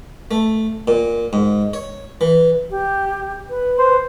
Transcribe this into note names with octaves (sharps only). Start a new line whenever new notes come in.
A3
A#2
G#2
C#5
E3
G4
B4
C5